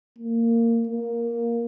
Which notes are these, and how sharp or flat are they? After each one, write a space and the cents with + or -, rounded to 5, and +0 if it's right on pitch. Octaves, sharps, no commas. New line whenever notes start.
A#3 -15
A#3 +5